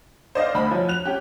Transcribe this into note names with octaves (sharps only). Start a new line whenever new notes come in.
C5 D5 D#5 F5
D2 B5
F3 F#3
F#6 F7
C#4 G4